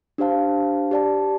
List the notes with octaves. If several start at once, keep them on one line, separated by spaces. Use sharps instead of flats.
D4 G4 C5 F5 A5
G4 D5 A5